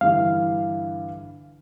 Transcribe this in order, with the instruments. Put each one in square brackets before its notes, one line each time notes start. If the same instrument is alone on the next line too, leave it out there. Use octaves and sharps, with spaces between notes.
[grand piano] G2 D3 E3 [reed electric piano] F5